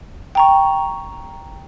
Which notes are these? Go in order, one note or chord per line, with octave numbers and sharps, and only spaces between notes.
G5 A#5 C#6